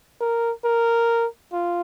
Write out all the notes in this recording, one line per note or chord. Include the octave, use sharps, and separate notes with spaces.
A#4
A#4
F4